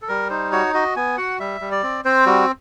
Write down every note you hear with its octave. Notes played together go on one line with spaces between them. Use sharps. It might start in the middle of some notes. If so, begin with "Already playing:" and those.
A4
G3 A#4
D#4 C5
F#4 C#5
F#4 D#5
B3 G#5
F#4 F#5
G3 E5
G3
D5
C4
C4 C5
G3 F#4